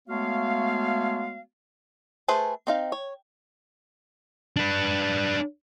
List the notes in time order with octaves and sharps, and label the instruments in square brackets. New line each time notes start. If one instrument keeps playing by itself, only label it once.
[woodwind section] G#3 A3 B3 F#4 C#5 F5
[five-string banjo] A3 G#4 B4 C5 A5
C4 D#4 F5
C#5
[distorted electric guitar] D4 B4